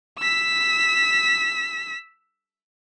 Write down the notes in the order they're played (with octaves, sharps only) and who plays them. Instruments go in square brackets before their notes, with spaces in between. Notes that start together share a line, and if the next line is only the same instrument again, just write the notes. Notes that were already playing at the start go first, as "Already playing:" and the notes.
[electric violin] E6 B6